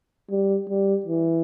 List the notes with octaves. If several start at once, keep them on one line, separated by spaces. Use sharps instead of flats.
G3
G3
E3